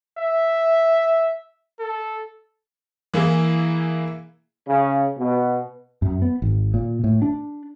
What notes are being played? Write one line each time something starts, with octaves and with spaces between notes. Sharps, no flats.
E5
A4
E3 A#3 E4 G#4
C#3
B2
F#2
B3
G#1
A#2
A2
D4